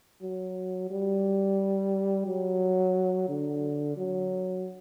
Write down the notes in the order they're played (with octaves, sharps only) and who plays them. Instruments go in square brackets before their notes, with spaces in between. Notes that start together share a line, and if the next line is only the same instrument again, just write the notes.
[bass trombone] F#3
G3
F#3
D3
F#3